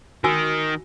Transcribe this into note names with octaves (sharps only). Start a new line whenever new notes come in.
D#3 F#4 G#5 E6